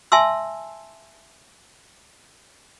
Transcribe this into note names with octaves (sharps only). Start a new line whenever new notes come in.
E5 G#5 A5 C6 E6